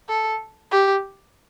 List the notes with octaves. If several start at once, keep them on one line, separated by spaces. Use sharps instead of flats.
A4
G4